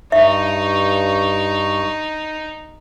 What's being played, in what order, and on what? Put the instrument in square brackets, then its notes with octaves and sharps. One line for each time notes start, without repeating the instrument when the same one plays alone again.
[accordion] G2 C#6 [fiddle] D#4 [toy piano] E5